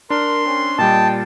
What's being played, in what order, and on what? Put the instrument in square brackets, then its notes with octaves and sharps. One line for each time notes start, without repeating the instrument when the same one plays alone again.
[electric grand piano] D4 [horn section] A#4 [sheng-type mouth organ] C6
[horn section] C4 C#4
[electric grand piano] A#2 G3 [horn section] D#5 G5 [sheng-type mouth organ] A5